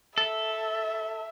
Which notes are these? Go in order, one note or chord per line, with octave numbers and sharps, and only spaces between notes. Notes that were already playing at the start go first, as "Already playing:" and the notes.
A4 E5